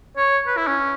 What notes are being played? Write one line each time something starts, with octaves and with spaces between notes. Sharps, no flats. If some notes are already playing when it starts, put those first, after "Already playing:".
C#5
B4
E4
C#4